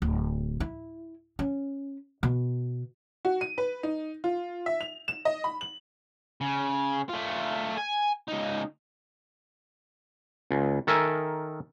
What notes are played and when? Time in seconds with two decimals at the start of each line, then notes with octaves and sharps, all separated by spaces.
0.02 D1
0.60 E4
1.39 C#4
2.23 B2
3.25 F#4
3.41 D#7
3.58 B4
3.83 D#4
4.24 F4
4.66 E5
4.81 F7
5.08 E7
5.25 D#5
5.44 B5
5.61 F#7
6.41 C#3
7.09 A3 F4
7.77 G#5
8.28 C#2 D#4
10.51 C#2
10.87 D#3 A4 A#4 E5 G#5